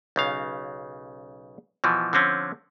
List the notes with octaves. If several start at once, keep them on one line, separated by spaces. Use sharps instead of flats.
B1 C#3 F5
B2 E3 F3
D3 F3 C4 C#4